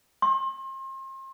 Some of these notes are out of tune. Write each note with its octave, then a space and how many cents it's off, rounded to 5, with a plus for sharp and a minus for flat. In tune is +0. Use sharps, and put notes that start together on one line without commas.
C6 +35